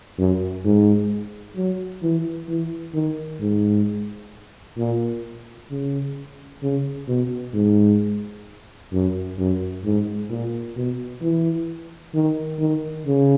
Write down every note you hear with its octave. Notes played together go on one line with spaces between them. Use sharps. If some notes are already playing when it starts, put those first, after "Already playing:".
F#2
G#2
F#3
E3
E3
D#3
G#2
A#2
C#3
C#3
B2
G#2
F#2
F#2
G#2
A#2
B2
E3
D#3
D#3
C#3